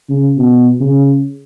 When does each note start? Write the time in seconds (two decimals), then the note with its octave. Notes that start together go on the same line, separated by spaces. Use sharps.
0.09 C#3
0.38 B2
0.80 C#3